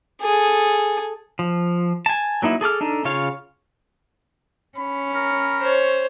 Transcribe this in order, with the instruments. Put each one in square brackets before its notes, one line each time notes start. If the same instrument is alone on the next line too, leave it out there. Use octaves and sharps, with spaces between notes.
[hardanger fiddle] G#4 A4
[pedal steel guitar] F3
G#5 A5
F#3 A#3 D#4 E4
G#4 A4 D6 F6
D4 D#4 A4
C#3 F4 C#5 F5
[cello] C#4 [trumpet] B5
[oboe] A#4
[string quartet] C5 C#5